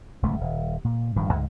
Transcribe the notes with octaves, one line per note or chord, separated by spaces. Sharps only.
D1 C#2 F#2 A3
D#1
A#2
D1 G2 D#3 F3
C#2 G#2 G#3